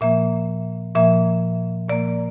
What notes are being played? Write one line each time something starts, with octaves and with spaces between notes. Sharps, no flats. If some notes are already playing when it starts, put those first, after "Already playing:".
A#2 F3 A#3 E5
A#2 F3 A#3 E5
A#2 F3 A#3 D5